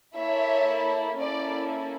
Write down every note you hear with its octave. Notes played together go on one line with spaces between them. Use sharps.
A#3 E4 A4 C#5 E5
A#3 C#4 E4 A4 D5